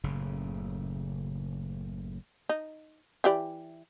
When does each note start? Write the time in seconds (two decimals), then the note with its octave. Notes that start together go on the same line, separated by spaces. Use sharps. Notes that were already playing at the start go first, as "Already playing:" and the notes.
0.04 F#1 A2 C#3
2.49 D#4
3.24 E3 G4 D5